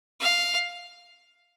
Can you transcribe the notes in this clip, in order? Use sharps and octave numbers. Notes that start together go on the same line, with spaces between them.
F5